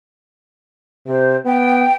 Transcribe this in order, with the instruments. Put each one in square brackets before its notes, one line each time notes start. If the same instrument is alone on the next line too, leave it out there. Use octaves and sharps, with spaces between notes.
[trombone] C3 [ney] C5
[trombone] B3 [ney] G5